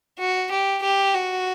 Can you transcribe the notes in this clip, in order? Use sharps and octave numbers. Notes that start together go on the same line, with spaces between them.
F#4
G4
G4
F#4